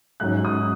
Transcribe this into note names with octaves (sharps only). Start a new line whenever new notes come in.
G#2 F#3 C#4 F#6
D#6